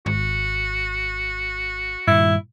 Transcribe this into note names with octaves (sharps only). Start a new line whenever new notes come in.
G#1 F#4
G2 A#2 D#3 E4